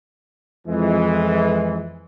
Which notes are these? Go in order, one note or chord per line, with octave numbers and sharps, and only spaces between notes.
F2 E3 G#3